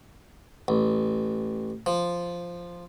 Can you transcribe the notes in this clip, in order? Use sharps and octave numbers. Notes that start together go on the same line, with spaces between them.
A1
F3